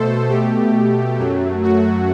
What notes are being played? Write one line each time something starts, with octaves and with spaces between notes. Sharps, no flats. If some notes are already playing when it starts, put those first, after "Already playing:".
Already playing: B2 A3 A4 C5
B2 A3 G4
F#2 F#3 A3
F#4